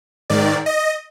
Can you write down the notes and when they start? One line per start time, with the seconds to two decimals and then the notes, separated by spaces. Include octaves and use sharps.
0.30 G#2 D#3 D5
0.66 D#5